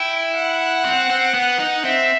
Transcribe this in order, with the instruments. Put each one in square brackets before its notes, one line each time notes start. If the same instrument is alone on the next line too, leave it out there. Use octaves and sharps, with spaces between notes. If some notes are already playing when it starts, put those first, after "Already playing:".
Already playing: [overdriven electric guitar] E4 [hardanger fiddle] G5
[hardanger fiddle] F#5
[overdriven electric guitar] C4
C4
B3
D#4
[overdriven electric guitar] C4 [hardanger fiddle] E5